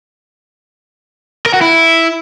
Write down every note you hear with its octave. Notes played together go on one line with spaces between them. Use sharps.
A#4
F#4
E4